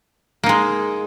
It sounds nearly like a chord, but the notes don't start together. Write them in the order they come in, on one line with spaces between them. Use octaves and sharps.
A#3 D#4 G#3